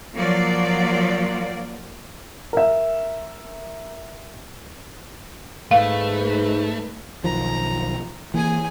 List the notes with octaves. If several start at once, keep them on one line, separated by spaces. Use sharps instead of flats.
F3 F#3 A#3 D5
A#4 E5
G#2 A3 D#4 B4 F5
B1 D#3 F3 A#5
E3 A#3 G#4 G#5